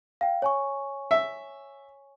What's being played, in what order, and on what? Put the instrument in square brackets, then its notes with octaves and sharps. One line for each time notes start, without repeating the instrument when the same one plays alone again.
[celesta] F5 G5
C#5 G#5 C#6
[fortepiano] E5